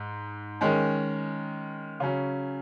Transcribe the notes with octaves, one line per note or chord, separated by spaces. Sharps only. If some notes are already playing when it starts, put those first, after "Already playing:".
Already playing: G#2
D#3 G#3 C#4
C#3 F#3 C#4